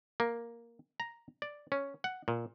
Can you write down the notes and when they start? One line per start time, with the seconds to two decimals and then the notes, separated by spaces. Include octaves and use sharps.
0.20 A#3
1.00 A#5
1.42 D5
1.72 C#4
2.04 F#5
2.28 A#2